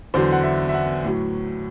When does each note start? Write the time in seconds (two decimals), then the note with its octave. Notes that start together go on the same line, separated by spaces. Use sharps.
0.14 E2 D3 F#3 C5
0.32 F#5
0.43 E5
0.69 E5
0.74 F#5
1.04 A2 F#3